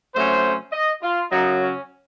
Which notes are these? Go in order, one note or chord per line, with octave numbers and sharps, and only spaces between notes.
C3 F#3 A3 C#4 C5
D#5
F4
F#2 C#3 F#3 D#4
C#4